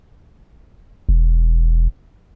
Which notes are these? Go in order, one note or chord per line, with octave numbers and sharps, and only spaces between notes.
E1